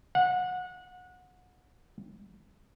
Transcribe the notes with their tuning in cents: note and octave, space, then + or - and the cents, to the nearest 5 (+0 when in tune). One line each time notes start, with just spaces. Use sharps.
F#5 -25